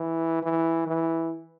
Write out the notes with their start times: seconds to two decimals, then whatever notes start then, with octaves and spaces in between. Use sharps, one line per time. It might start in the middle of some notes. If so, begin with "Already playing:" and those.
Already playing: E3
0.43 E3
0.87 E3